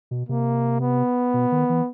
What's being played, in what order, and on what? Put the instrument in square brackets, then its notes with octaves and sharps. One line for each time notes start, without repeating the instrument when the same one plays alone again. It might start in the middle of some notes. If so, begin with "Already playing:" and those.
[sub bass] B2
[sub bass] C3 [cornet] A#3
[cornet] B3
[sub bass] B2
D#3
E3